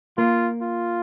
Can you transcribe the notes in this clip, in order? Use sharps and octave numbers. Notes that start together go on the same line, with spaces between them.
A#3 F4
F4